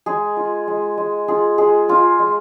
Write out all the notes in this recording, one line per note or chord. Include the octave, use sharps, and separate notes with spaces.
G#3 G#4
F4
G#3
G#3
F4 G#4
G#3 G#4
G#3 F4
G#3